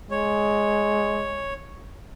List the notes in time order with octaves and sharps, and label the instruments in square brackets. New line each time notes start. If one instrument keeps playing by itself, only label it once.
[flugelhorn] G#3 [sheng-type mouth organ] C#5